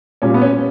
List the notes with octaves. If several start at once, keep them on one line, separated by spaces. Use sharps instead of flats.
A#2 G3 C#4
B3
C#4